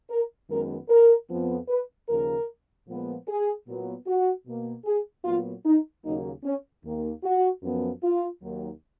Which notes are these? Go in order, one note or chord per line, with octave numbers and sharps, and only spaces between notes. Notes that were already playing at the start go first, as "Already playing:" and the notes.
A#4
F#2 D#3 G#3 B3 A#4
A#4
F2 F3 B3
B4
D#2 C#3 F3 A#4
A#2 F3 G#3 B3
G#4
A#2 F#3 B3
F#4
B2 A#3
G#4
A#2 F#3 B3 F4
D#4
D#2 C#3 F#3 A#3 D#4
C#4
D#2 D#3 A#3
F#4
F#2 F3 B3
F4
D#2 D#3 F#3